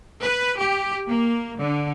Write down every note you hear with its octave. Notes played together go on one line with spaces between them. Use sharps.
B4
G4
A#3
D3